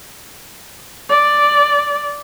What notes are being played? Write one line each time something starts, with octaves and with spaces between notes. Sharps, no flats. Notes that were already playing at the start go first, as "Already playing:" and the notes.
D5